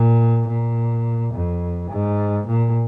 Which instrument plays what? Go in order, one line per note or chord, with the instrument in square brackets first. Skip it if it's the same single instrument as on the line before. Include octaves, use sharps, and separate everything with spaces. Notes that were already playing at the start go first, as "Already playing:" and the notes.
Already playing: [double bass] A#2
A#2
F2
G#2
A#2